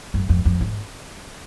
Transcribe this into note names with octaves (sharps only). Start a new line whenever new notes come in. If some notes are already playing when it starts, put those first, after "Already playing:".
F#2
F2
F2
G#2